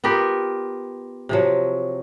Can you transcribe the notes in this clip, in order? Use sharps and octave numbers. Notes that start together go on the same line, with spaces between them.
B3 F4 G4 A#4
C3 F3 F#3